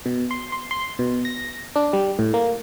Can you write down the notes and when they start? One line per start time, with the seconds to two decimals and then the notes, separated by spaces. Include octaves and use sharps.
0.06 B2
0.31 C6
0.52 C6
0.71 C6
0.99 B2
1.25 A#6
1.76 D4
1.93 G3
2.19 A2
2.34 A#3